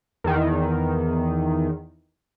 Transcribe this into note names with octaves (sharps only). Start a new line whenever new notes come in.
E2 D#3